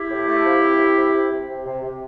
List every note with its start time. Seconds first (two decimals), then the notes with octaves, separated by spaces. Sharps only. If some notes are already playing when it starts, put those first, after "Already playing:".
Already playing: E4 G4
0.10 A2
0.27 A3
0.45 F3
0.62 C3
0.79 C3
0.96 C3
1.14 C3
1.31 C3
1.48 C3
1.66 C3
1.83 C3